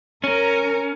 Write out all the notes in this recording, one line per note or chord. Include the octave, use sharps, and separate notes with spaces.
C#4 A#4